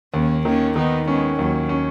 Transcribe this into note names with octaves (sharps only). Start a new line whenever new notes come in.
D#2 A#3 C#4
D#3 A#3 C#4
D#3 B3 D#4
G#3 B3 C#4
D#2 F#3 A#3
C#4